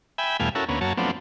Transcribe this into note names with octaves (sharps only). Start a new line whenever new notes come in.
E5 G5 G#5 B5
E2 B2 G3 A3 F5 G#5
C#4 E4 F#4 A4 A#4
D2 A#3 B3 C#4
F#2 F#3 A#3 C#5 A5
F3 F#3 A3 B3 C4 D4